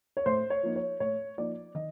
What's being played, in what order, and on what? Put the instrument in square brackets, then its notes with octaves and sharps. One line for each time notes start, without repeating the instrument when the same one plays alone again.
[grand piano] C#5
A2 C5
C#5
F3 A#3 D#4
C#5
A2 C#5
F3 A#3 D#4 D5
D#3 D#5